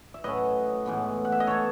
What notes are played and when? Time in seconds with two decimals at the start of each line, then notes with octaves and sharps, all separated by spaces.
0.14 E5
0.24 A2 F#3 C#4 B4 D#5
0.86 A2 E3 G#3 B3
1.25 F#5
1.32 E5
1.40 D#5
1.47 E3 B3 A4 C#5